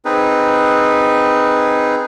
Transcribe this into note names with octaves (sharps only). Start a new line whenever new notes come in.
C4 D#4 G#4 B4